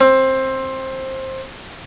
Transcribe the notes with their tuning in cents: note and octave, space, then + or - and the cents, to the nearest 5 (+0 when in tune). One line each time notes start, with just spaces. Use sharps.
C4 +15